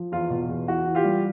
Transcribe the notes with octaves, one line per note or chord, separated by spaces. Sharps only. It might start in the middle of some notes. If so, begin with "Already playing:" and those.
Already playing: F3
E2 F4
B2
E2
E3 F#4
E3
F4 G4
G3